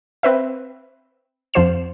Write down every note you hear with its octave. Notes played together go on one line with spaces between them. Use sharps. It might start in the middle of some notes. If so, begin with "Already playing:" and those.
C4 B4 E5
F2 F3 F4 C5 C7 E7